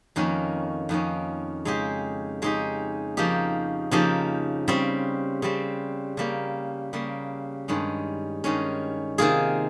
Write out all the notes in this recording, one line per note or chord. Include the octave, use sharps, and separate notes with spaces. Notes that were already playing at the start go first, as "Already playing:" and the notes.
F2 D#3 A#3 C#4
F2 D#3 A#3 C#4
C#3 G#3 D#4 G4
C#3 G#3 D#4 G4
C#3 F3 A#3 D#4 G4
C#3 F3 A#3 D#4 G4
C#3 G3 C4
C#3 G3 C4
C#3 G3 A#3
C#3 G3 A#3
G2 D#3 G#3 C#4
G2 D#3 G#3 C#4
C3 D#3 A#3 F4 G#4